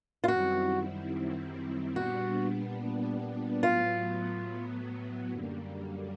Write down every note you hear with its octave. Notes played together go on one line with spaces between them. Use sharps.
F4
F#2 D#3 G3 C4 E4 F#4
A#2 G3 B3 D4 F#4
A2 F#3 B3 F4
F#2 D3 G3 A#3